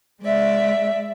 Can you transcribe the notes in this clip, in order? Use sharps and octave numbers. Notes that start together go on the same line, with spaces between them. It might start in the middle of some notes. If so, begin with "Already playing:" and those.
G#3 D5 E5